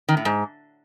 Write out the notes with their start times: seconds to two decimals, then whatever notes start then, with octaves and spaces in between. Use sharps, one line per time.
0.09 D#3
0.17 A2
0.25 G#2